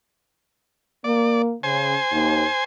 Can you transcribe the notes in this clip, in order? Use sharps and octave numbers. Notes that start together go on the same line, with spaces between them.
A#3 D5
C#3 C5 G#5
D#2